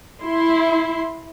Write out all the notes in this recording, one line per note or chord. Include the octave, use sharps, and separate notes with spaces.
E4 C6